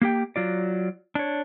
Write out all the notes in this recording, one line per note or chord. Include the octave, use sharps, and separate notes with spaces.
A#3 G4 G5
F#3 F4 D5
D4 C#5